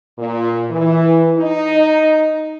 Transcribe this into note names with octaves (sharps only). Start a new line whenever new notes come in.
A#2
E3
D#4